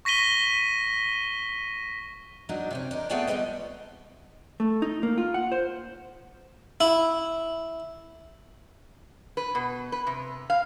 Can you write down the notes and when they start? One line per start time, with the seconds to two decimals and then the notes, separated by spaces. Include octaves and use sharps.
0.05 C#6 A#6 B6 D#7 G7
2.49 A#2 F#3 D4 D#4
2.71 C3 C#4 D4
2.91 D4 D#4 A#4
3.10 A3 B3 G#4 D5 G5 A5
3.27 G3 G#3 B3 B4 D#5
4.60 A3
4.82 D#4
5.03 A#3
5.18 F4
5.34 F#5
5.52 C5
6.81 E4
9.37 B4
9.55 B2
9.92 B4
10.07 C3
10.50 F5